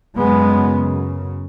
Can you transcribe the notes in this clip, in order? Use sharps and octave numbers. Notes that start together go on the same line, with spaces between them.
F#2 C#3 G#3 B3